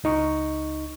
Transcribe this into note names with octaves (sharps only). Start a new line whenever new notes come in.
C#2 D#4 C#6